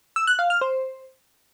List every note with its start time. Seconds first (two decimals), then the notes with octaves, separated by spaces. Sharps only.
0.16 E6
0.27 F#6
0.39 F5
0.50 F6
0.61 C5